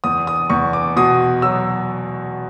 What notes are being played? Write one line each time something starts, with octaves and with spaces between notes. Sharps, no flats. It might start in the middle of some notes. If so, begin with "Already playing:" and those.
E2 D#6
D#6
E2 C#6
D6
B2 D#6
F#3 E6